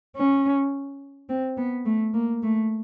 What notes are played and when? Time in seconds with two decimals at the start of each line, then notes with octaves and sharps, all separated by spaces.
0.16 C#4
1.29 C4
1.57 B3
1.85 A3
2.14 A#3
2.43 A3